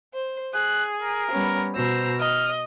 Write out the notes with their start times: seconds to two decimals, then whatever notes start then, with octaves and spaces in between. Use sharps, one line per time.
0.14 C5
0.54 G#4 F#6
1.02 A#4
1.31 G3 B3 C#4
1.75 B2 C5 A#5 E6
2.20 D#5 F6